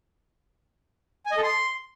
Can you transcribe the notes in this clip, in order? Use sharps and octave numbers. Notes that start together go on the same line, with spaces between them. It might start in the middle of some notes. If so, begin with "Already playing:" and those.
G#5
D#5
A4
C6